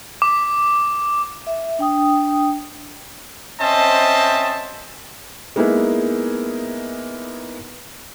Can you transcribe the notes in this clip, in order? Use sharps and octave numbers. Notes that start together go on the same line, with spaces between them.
D6
E5
D4 G5 D#6
C4 C#4 C5 D#5 E5 A5
G#3 A#3 B3 D#4 E4 G#4